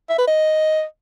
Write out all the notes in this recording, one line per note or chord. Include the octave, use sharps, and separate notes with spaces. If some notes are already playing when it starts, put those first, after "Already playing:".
E5
B4
D#5